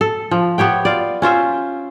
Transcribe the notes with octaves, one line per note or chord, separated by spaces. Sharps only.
A4
F3
B3 G4 C#5 G5
F4 D5
C#4 F4 C5 E5